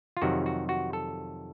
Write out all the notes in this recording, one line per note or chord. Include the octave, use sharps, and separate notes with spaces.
F4
F2 C3 D#3 F#3 F#4
F#4
F#4
A4